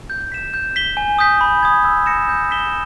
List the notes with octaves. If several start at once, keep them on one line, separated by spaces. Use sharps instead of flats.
G6
B6 E7
G6
B6 G7
G#5
D#6 G6 B6
B5
D#6 G#6
E6
A#6 C#7 E7
G6
B6 E7 G7